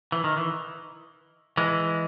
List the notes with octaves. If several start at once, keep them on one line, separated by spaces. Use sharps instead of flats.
E3
D#3
E3
E3 G#3